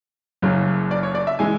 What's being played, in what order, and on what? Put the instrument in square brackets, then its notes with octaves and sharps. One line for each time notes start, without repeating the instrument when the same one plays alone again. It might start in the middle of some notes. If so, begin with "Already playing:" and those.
[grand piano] F#1 F#2 C#3 F#3
D5
C#5
D5
E5
E3 G#3 G#5